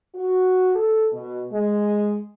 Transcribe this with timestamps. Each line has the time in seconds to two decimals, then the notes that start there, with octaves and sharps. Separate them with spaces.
0.14 F#4
0.75 A4
1.11 B2
1.52 G#3